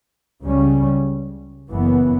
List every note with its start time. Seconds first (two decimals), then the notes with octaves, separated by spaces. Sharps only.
0.42 C#2 C#3 G3 C#4
1.68 F#1 F#2 E3 B3